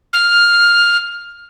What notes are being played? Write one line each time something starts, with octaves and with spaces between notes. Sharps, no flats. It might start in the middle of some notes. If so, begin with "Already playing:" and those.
F6